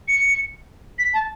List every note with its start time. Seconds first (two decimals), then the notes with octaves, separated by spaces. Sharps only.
0.08 C#7
0.99 B6
1.14 A5